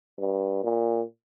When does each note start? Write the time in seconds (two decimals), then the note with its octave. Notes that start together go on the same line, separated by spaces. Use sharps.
0.20 G2
0.63 A#2